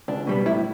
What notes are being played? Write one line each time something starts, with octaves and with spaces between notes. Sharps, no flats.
C#2 D4
B2 G3 B3
A2 E4